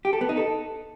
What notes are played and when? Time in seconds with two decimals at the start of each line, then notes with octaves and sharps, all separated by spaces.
0.05 G4
0.13 A4
0.21 B3
0.29 D#4
0.37 A4